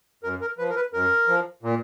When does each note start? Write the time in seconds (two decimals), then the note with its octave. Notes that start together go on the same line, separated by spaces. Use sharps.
0.23 F#2 A#4
0.41 A#4
0.58 F3 B4
0.69 A#4
0.76 B4
0.93 F#2 A#4
1.28 F3
1.63 A#2